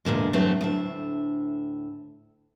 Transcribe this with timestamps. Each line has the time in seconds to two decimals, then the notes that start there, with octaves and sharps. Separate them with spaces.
0.05 E2 A#2 D3 G#3
0.33 E2 G2 F#3 A3 B3 C4
0.61 D2 A2 E5